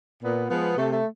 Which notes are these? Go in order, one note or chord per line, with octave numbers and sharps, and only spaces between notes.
A#2 B3
F3 G#3 B3
C3 A3
A3